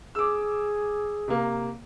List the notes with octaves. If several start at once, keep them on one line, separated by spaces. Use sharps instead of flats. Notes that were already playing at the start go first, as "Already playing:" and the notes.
G#4 D6 E6
C3 A#3